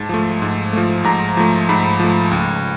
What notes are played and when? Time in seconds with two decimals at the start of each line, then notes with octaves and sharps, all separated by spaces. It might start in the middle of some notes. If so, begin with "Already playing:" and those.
Already playing: G#2 A5
0.09 F3 A3
0.42 G#2
0.73 F3 A3
1.04 G#2 A#5
1.37 F3 A3
1.69 G#2 B5
2.00 F3 A3
2.31 C#2